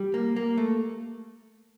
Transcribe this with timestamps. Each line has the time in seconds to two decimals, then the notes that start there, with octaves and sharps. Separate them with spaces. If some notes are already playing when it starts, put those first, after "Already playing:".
Already playing: G3
0.14 A#3
0.36 A#3
0.58 A3